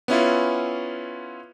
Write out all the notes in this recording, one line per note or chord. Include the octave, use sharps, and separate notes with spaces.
B3 C#4 E4 F4